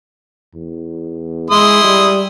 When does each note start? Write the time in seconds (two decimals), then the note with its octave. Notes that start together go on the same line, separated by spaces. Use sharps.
0.55 E2
1.51 G#3 E4 C6 D#6
1.84 G3